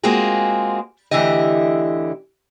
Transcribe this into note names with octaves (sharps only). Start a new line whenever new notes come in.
G#3 A#3 C4 F4 F#4 G#4
D2 D3 E3 E4 G4 D#5